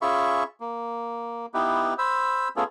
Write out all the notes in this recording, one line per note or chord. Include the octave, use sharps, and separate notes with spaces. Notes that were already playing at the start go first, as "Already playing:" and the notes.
C#4 F4 G#4 E5 B5 C#6
A#3
B3 D#4 E4 G4 B4
C5 B5 E6
A3 B3 C#4 F4 G#4 A4